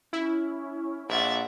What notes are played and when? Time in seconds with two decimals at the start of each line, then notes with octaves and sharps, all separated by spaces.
0.13 C#4 E4
1.09 A#1 D5 E5 F#5